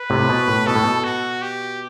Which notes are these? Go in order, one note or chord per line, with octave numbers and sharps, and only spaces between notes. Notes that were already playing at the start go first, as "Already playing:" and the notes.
Already playing: B4
A2 C3
A2
B2
A2
B2 A4
A2
B2
F#4
G4